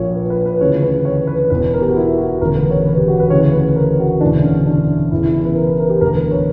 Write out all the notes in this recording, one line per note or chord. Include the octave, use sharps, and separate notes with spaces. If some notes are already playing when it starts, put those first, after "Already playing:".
Already playing: A#1 A#2 C#5
B4
B4
B4
D2 C#3 E3 C#5
B4
C#5
B4
E1 E2 B2 B4
A#4
G4
F#4
E4
F#4
E1 D2 C#3 A#4
B4
C#5
B4
G4
F#4
B4
D2 C#3 E3 C#5
B4
A#4
F#4
E1 D2 C#3 E3 D4
C#4
D4
E1 E2 C#3 E4
E4
E4
B4
A#4
B4
A#4
G4
E1 D2 D3 A#4
B4
C#5